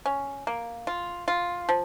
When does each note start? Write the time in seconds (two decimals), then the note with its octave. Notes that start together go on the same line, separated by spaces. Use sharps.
0.06 C#4
0.47 A#3
0.87 F4
1.28 F4
1.69 F3